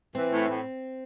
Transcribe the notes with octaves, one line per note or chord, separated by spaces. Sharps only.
E3 C4
A2
A2